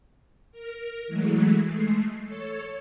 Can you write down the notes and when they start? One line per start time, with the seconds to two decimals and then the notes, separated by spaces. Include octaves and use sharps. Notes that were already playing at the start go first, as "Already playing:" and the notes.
0.52 A#4
1.07 E3 F#3 G#3 A3
1.62 G#3 A3 C7
2.25 A4 C#5